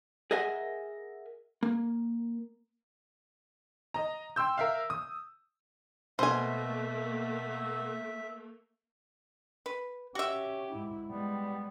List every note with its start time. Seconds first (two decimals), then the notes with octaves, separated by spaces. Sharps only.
0.31 G#4 A#4 D#5 E5 F#5 G#5
1.63 A#3
3.94 D#5 A#5
4.36 G5 C6 E6 G6
4.58 A#4 E5 F5
4.90 D#6
6.19 B2 A3 A#3 C5 E5 G#5
9.66 B4
10.15 C#4 F#4 G4 E5
10.72 G#2 E4
11.10 G3 G#3 B3